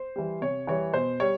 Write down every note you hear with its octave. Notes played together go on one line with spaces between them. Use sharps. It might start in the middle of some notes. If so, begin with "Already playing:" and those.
Already playing: C5
E3 G3
C3 C#5
E3 G3 C#5
B2 C5
G3 C#5